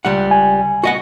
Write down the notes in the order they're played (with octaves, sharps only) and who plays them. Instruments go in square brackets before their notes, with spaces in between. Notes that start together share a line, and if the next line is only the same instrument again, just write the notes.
[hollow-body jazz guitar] C#2 G3 F#5
[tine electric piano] G#5
[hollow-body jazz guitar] F#4 D#5 F#5